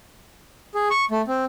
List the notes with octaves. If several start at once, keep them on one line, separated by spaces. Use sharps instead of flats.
G#4
C#6
A3
C4